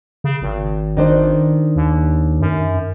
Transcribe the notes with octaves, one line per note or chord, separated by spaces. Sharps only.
C#3
G#1
D#3 D4 C5
D#2
F#2